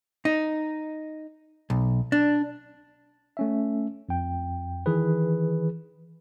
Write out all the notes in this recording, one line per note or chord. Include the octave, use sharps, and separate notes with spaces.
D#4
B1
D4
A3 C#4 E5
F2 G5
D#3 E3 G#4 B4